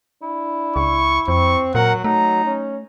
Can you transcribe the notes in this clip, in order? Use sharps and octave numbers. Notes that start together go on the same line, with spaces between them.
D4 E4
C#2 C#6
F2 C4 C#6
A#2 F#3 A#4 F#5
F#3 A3 D#4 A#5
C#4